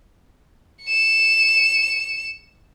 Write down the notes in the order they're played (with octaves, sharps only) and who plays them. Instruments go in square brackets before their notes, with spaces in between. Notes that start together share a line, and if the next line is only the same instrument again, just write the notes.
[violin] C#7 E7